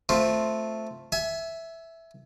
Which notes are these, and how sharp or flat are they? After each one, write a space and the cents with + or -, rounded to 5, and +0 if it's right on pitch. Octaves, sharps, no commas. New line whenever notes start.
A3 +0 C4 +0 F4 +0
E5 +0 G#5 +30